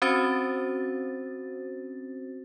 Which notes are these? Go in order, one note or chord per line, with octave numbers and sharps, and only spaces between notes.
C4 C#4 F#4 C5 A6